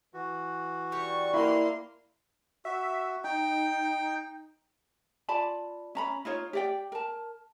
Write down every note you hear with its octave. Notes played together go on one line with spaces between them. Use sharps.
E3 F#4
G3 C#6
A#3 E4 C6
F#4 E5
D#4 G5
F4 D5 A5 B5
C#4 A#5 B5
D#4 F4 C#5
G4 D5 G5
A#4 A5